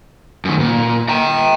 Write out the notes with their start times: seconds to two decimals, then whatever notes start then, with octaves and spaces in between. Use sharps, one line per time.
0.45 F#2 D#3
0.60 A#2
1.09 G5 A#5